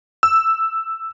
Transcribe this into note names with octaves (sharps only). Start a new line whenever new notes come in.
E6